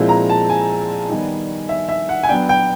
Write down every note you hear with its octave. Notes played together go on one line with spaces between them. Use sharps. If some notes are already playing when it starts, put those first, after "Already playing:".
Already playing: A#2 F3 G#3 C4 E4
A#5
A5
G#5
D#3 G3 B3 D#4
E5
E5
F#5
G#5
F#3 B3 D4 G5
G5